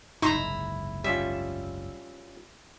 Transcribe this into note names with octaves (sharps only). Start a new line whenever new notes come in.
F#1 C2 G#2 D#4 E4 A#5 C6
G3 C#4 F4 E5